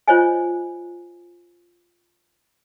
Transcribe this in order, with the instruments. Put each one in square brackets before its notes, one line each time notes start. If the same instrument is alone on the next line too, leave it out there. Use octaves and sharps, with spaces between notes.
[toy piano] F4 C5 C#5 D#5 G#5